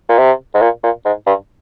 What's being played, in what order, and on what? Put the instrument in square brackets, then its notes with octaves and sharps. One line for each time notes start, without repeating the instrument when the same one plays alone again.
[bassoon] A#2
C3
G#2
A#2
A#2
G#2
G2